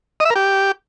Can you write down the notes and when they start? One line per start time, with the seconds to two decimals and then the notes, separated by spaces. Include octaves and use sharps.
0.20 D#5
0.25 E5
0.30 A#4
0.36 G4